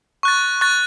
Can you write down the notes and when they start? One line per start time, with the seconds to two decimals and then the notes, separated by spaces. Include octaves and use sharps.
0.23 C#6 F#6 A6
0.61 C#6 F#6 A6